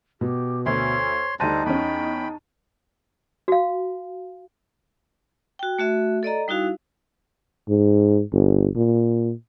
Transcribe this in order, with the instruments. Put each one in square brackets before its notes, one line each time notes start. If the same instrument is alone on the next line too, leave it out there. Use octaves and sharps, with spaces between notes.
[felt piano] B2 [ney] G4
[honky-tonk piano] D2 [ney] C5 [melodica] C#5 C6
[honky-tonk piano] D2 F#6 [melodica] G3 C5 A#5 [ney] D#4 [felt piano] A5 D#7
[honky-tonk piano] E2 C#4 [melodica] G5 B5
[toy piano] F#4 F5
[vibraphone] F#4 G5
A3 F#4 E5
A4 D5 D#5 A#5
G3 D#4 E4 F#4 F5
[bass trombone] G#2
G1
A#2